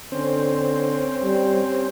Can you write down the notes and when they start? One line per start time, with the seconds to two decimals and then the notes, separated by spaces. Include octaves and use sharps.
0.12 D3 C4 C#4 C5
1.23 G3